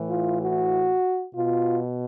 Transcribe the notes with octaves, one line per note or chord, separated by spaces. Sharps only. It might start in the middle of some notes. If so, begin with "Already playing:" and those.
Already playing: A2 E3
F4
F#4
B2 F4